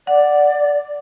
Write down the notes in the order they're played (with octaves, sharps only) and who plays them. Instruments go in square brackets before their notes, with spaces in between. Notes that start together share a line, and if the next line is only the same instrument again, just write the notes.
[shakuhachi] D5 [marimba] F#5